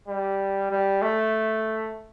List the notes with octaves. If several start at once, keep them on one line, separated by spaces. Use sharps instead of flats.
G3
G3
A3